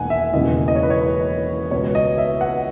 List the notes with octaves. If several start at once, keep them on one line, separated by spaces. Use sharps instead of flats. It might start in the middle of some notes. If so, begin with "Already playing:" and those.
Already playing: E1 D#2 F#5 G#5
E5
E1 D#2 C#3 E3 D#5
D#5
C#5
B4
C#5
B4
C#2 B2 C#5
D#5
E5
F#5